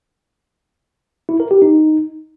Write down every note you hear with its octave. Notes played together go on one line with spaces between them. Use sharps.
E4
A#4
G4
D#4